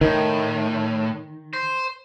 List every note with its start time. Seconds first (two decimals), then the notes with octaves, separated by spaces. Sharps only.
0.01 A2 D#3
1.53 C5